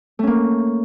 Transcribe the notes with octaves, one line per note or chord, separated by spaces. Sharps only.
A3 A#3 C#4